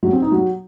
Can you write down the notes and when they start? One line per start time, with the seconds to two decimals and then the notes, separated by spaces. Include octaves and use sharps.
0.03 F#3
0.12 C4
0.22 D#4
0.32 F#3